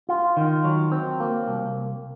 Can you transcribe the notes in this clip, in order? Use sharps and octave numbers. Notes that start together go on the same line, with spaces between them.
F4
D#3
F#3
C4
A#3
C2